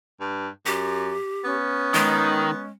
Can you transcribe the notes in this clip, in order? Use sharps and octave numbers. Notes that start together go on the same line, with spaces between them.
G2
F#2 G4
B3 C#4
D#3 G#3